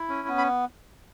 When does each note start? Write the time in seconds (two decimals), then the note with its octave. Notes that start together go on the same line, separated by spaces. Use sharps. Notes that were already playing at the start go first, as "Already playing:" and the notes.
Already playing: E4
0.09 C#4
0.28 B3
0.38 B5